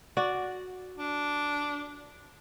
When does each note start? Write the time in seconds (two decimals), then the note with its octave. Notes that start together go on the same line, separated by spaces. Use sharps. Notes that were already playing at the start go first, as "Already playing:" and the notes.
0.17 F#4 D5
0.98 D4